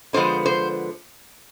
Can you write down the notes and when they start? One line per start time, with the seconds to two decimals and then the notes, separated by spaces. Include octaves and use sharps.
0.13 D3 F3 G#3 B3 C5
0.46 C5